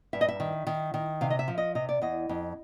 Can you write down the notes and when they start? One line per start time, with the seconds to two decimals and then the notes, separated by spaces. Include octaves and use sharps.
0.13 G2 E5
0.21 D#5
0.28 E5
0.40 D#3
0.67 D#3
0.94 D#3
1.21 C3 F5
1.30 D#5
1.39 E5
1.48 F3
1.58 D#5
1.75 C3 D#5
1.89 D5
2.02 E2 D#5
2.29 F2